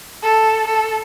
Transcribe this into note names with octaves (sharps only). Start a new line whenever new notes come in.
A4
A4